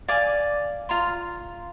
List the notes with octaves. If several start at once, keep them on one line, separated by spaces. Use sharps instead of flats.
D5 F5 G#5 D6
F4 A#5 C6